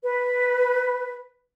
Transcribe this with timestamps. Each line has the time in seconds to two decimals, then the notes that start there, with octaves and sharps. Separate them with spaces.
0.02 B4